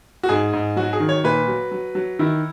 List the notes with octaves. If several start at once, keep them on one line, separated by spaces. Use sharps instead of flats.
F#4
G#2 G#4
G#2
F#3 F#4
G#4
D#3
C#5
A#2 B4
F#3
F#3
F#3
D#3 E4